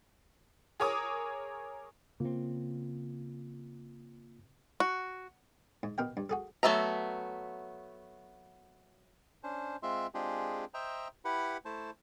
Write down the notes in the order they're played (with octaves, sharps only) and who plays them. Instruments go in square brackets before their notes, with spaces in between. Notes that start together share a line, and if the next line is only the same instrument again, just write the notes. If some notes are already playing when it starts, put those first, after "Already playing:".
[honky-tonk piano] G#4 A#4 C#5 G#5 D6 D#6
[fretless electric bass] C#3 C4 [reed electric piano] A#3 F4
[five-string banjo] F#4
[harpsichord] G#2
B2 A#4 G5
G2
F#4 G#4 A4
[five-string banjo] F#3 A3 B3 E5 A#5
[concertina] C#4 D4 C5
G#3 C4 F4 E5 C6
G#3 C4 D4 F4 G4 G#4
C5 D#5 E5 G5 A#5
E4 G4 B4 F#5 B5
A3 E4 C5 A5